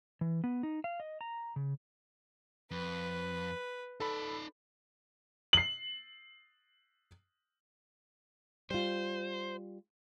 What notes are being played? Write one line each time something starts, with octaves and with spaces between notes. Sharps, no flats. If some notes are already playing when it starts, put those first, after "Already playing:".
E3
B3
D#4
F5
D#5
A#5
C#3
F2 B4
D#4 A4 D5 B5
C7 F#7
G3 F4 C5